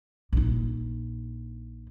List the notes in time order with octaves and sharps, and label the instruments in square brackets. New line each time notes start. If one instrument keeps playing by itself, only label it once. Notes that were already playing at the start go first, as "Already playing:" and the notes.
[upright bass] A#1 D#4